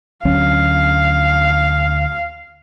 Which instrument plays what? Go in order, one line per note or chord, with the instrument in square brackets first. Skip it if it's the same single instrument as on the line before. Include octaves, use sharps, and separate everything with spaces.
[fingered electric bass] D2 F#3 C#4 [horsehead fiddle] F5